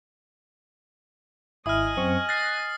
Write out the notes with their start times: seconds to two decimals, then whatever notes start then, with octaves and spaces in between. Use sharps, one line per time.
1.66 G#1 E4 D#5 G#5 D#6 F6
1.97 F#2 C4 C#6
2.29 F#6 A6 A#6 C7